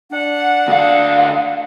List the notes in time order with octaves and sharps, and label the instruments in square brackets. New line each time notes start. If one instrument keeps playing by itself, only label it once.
[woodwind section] D4 F#5
[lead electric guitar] D2 F5